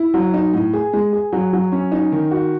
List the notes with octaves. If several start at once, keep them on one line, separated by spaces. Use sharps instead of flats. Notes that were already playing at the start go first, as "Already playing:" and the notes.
Already playing: E4
F#3
D#4
A2
G#4
G#3
G#4
F#3
F#3
C#4
D#4
D#3
F#4